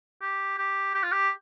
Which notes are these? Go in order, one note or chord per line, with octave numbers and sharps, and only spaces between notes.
G4
G4
G4
F4
G4